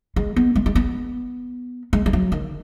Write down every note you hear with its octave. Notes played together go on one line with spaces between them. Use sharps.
G#3
B3
G#3
G#3
B3
G#3
G#3
F#3
D#3